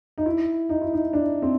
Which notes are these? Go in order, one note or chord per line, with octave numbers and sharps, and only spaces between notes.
D#4
E4
D#4
E4
D#4
D4
C4